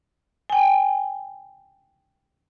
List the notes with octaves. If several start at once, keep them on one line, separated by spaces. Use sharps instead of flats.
G5 G#5